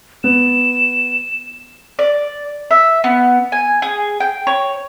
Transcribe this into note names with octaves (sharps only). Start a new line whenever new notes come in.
B3 E7
D5
E5
B3
G#5
G#4
G5
C#5